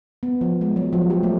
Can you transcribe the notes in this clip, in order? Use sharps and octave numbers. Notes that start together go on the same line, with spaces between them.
B3
F3
G#3
F#3
F3
G4
A3